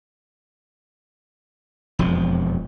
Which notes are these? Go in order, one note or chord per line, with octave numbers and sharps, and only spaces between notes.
E1 F2 F3